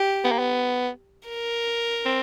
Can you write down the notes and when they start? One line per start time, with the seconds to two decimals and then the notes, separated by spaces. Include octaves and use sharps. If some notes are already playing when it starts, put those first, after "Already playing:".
Already playing: G4
0.24 B3
0.32 A#3
0.39 B3
1.28 A#4
2.05 C4